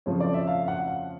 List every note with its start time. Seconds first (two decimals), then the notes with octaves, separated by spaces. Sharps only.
0.06 F2 C#3 F3 A3 C#5
0.20 D5
0.34 E5
0.47 F5
0.68 F#5
0.88 F5